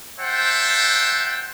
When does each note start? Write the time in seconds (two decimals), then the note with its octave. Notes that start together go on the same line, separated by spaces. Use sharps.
0.19 C5 E5 F#5 G5 A5